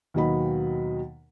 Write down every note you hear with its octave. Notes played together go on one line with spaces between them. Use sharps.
D#2 B2 D#3 F#3 D#5 B5